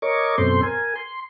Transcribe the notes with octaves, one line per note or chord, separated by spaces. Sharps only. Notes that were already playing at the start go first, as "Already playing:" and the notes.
A#4 C#5 D#5 C#6 D6
F#2 B2 C4 A4 C5 C6
A#4 G#5
C6